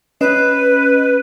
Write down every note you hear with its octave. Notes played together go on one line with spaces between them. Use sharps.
C#4 B4 D#5